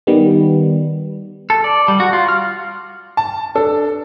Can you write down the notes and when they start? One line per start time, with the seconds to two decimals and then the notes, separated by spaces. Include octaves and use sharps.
0.07 D#3 G3 B3
1.50 A4
1.64 D5
1.88 G3
2.00 F#4
2.13 F4
2.28 F6
3.17 A5
3.55 D4 A4